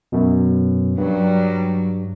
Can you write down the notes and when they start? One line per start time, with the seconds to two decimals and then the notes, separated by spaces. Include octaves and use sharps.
0.12 F#2 B2
0.98 G2 F#3 G3